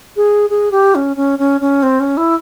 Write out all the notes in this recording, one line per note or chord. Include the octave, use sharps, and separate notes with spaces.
G#4
G#4
G4
C#4
C#4
C#4
C#4
C4
C#4
E4